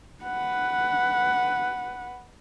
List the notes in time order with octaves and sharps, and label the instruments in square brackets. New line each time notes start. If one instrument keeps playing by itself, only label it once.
[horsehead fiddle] B4 F#5